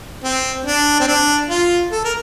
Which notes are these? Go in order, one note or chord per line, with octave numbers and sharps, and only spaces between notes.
C4
D4
C4
D4
F4
A4
A#4